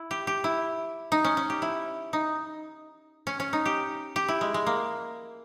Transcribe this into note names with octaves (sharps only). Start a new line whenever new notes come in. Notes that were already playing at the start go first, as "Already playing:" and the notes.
Already playing: E4
G4
G4
E4
D#4
C#4
C#4
G4
E4
D#4
C#4
C#4
D#4
G4
G4
E4
G#3
G#3
A#3